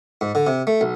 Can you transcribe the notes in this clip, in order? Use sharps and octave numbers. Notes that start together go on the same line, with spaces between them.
G#2
D3
C3
A3
B1